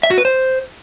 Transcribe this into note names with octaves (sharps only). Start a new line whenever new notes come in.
E5
F#4
B4
C5